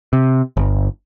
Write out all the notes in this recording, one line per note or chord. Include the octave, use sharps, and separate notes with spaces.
C3
G1